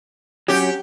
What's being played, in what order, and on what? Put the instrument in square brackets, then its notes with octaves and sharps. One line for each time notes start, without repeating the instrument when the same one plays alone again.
[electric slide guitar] F#3 C#4 [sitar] G4